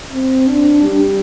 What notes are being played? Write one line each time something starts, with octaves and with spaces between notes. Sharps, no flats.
C4
D4
G3